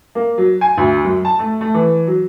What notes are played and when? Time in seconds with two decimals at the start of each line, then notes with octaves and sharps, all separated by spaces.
0.15 A#3
0.38 F#3
0.61 G#5
0.77 D2
1.04 F#2
1.25 A5
1.39 A3
1.61 A3
1.74 E3
2.07 F#3